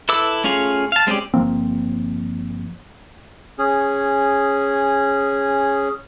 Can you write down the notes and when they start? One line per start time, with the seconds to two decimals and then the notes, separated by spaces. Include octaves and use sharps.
0.09 E4 A4 B4 D6 E6
0.44 A3 C#4 F4 G#4 F5
0.92 F5 A5
1.07 G#3 C4 C#4 G4 D5
1.34 G1 F3 A#3 C4
3.58 C#4 G#4